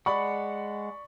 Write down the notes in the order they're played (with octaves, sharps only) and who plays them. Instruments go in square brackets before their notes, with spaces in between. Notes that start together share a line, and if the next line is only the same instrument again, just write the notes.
[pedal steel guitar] G#3 F#5 [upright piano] D5 B5 C#6